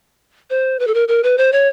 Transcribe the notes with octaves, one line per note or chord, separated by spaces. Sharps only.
C5
B4
A4
A#4
A#4
B4
C5
C#5